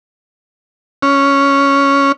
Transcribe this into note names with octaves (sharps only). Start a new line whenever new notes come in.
C#4